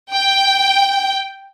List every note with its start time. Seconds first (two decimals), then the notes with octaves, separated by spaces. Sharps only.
0.12 G5